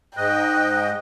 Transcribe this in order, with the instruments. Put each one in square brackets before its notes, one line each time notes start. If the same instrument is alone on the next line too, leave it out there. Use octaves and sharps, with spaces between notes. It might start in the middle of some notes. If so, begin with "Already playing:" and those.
[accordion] G#2 D#5 [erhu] G5 [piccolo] F#6